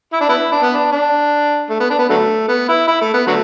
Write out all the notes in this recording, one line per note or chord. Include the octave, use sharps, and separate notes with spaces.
E4
D4
B3 E4
D4
B3
D4
D4
A3
B3
D4
B3
D3 F#3 A3
B3
E4
E4
A3
B3
D3 F#3 A3